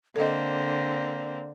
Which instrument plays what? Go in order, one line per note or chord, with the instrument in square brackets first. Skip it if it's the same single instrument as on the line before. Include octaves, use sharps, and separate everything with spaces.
[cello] D3 [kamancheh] A#3 C4 [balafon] A4 D#5 [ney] D5